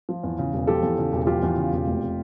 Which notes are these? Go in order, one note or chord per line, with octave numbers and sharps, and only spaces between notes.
F3
E2
C#3
E1
F3 G4 A4
E2
C#3
E1
F3 F4 G4
E2
C#3
E1
F1